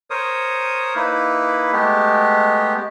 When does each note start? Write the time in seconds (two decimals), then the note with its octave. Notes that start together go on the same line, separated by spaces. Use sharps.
0.10 A#4 C5 C#5 D#6
0.96 A#3 D#4 E4 B4
1.72 G#3 A3 B3 G4